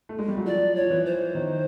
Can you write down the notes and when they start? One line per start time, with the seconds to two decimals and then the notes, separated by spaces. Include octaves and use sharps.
0.09 A3
0.19 G#3
0.28 G3
0.37 F#3
0.46 F3 D5
0.76 F3 C#5
0.91 E3
1.06 C5
1.35 D#3